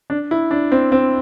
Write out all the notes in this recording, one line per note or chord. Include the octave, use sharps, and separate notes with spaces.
D4
E4
D4
C4
C4